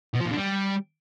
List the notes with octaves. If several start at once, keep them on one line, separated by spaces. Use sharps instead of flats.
B2
F3
A#2
D3
G3